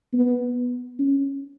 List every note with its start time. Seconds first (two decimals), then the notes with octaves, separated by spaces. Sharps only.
0.13 B3
0.99 C#4